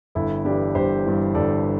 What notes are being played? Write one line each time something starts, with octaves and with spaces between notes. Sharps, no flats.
G1 E4 A4
G2 E3 D4 G4
G1 G4 C5
G2 E3
G1 A4 D5